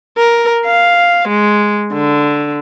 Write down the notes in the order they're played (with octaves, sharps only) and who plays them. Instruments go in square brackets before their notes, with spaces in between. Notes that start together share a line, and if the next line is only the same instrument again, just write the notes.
[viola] A#4
F5
G#3
D3